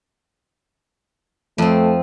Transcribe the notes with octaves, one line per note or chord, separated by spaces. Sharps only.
F2 A3 C4